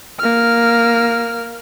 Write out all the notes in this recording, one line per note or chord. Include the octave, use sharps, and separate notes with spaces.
A#3 F6